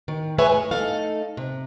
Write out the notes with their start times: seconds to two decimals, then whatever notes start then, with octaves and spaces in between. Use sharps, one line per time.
0.08 D#3
0.38 G#3 G#4 B4 C#5 E5 G#5
0.49 A2
0.71 A3 D#4 A4 F5
1.37 C3